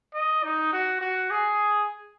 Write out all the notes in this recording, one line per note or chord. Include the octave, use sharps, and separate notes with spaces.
D#5
D#4
F#4
F#4
G#4